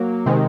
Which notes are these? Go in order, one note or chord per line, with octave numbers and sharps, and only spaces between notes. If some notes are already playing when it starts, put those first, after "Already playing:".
Already playing: F#3 A#3
C3 D#3 G#3